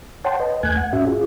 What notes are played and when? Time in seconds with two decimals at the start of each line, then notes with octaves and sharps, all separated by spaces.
0.25 C#5 F#5 G5 A5 C6
0.40 B4 D#5
0.63 E2 A3 G#5 F#6 G#6
0.77 F#5
0.93 G#2 C#4 F#4 E5
1.07 F4 G#4